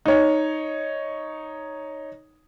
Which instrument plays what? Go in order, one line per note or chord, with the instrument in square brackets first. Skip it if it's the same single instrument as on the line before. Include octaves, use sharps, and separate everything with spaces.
[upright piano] D#4 C#5